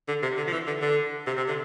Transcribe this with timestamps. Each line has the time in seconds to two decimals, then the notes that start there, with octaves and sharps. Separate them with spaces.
0.08 D3
0.22 C3
0.37 D3
0.48 F3
0.53 E3
0.67 D3
0.82 D3
1.27 C3
1.37 C3
1.48 D3